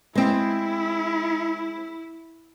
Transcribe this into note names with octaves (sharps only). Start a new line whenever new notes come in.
G#3 C4 E4